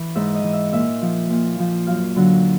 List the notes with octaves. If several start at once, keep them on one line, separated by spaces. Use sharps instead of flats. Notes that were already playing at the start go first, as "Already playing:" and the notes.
Already playing: E3
G#2 E5
D#5
E3
E5
A#2 E5
F3
A#2
F3
F#2 F5
D3 F#3